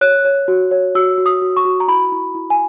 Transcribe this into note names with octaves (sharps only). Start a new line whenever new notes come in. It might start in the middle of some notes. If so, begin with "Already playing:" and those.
C#5 F#6
C#5
F#4
C#5
F#4 E6
F#4
D#6
F#4
C#6
F#4
A#5
E4 B5
E4
E4
G#5